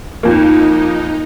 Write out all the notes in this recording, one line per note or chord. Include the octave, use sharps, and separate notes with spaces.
F2 A#3 D#4